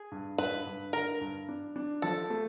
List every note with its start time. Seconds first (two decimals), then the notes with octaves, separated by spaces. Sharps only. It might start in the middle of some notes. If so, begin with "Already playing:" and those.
Already playing: G#4
0.11 G2
0.38 G2 B4
0.66 G2
0.93 D3 A#4
1.21 G2
1.48 D4
1.76 D4
2.02 F3 A4
2.30 A3